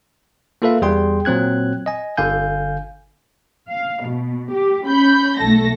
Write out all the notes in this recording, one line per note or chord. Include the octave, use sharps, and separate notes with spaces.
A#3 F4 A4 B4 E5 F5
E2 G3 G#4 G5 C6
A#2 F#3 C4 F#6 G#6
D#5 G#5
G1 D3 F5 G#5 G6
F5
B2
G4
C#4 B5 G6
B1 A3 A4 A#6